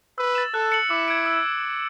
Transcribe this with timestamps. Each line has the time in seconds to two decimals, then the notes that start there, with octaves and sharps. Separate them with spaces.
0.18 B4 E6
0.35 A6 E7
0.54 A4 F#6
0.72 C#7 F#7
0.90 E4 D6
1.08 G#6 D7
1.26 E6